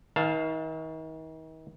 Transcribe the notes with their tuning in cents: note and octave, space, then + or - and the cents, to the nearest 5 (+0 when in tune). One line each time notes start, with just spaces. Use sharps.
D#3 +40 F5 +0 A5 +0